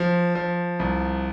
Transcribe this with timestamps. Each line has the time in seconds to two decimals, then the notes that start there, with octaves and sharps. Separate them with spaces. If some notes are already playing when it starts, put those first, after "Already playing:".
Already playing: F3
0.35 F3
0.79 C2